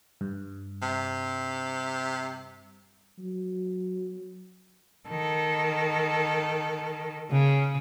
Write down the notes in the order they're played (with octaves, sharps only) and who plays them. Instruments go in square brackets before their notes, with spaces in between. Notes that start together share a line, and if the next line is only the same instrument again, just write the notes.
[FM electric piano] G2
[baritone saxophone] C3
[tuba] F#3
[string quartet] D#3 A4
[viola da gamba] C#3